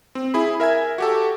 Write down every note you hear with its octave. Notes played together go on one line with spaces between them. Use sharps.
C4
E4 G#4 B5
A#4 E5 G#5 G#6
F#4 G4 A4